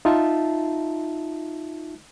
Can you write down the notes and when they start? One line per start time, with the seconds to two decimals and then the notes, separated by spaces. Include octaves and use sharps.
0.05 D#4 F4 E5 A5